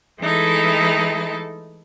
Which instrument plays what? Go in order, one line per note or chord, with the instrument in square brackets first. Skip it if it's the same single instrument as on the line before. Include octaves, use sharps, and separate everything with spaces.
[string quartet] E3 G#3 A3 D#4 E4 A4